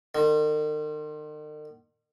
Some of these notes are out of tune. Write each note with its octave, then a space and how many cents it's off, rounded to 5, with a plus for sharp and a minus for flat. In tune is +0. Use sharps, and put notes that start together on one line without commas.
D#3 -45